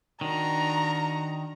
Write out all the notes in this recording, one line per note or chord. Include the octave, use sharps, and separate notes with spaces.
D#3 D4 F#4 A#5